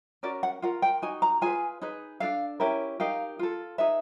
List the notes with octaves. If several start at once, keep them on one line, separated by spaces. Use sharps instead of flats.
C#4 F#4 A#4 D5
F#5
F4 A#4 F#5
G5
D#4 F#4 G#5
A#5
F4 G#4 B4 G#5
D#4 G#4 B4
D4 F4 A4 F5
C#4 E4 G4 A#4
D#4 G4 A#4 F5
F4 A4
D#4 G#4 B4 E5